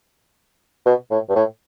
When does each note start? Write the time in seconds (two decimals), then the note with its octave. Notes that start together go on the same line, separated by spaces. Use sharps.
0.86 B2
1.11 A2
1.29 G2
1.36 A2